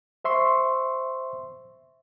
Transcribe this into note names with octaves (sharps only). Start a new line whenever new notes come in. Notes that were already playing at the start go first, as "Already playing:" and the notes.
C5 E5 C6 C#6